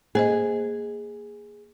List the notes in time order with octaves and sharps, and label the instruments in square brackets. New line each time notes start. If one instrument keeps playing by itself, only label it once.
[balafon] A#3 C5 D#5 [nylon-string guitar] G#4